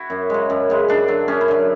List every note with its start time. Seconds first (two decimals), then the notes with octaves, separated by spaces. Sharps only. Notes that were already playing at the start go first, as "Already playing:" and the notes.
Already playing: E4 F#4
0.10 F#2
0.30 C#3 G#3
0.50 F#2
0.70 C#3 G#3
0.88 F#2 D4
1.08 D3 F#3
1.28 F#2 C#4
1.41 E4
1.48 D3 F#3